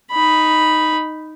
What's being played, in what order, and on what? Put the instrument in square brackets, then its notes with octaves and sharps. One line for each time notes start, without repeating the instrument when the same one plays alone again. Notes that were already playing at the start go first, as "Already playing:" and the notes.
[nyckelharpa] D#4 B5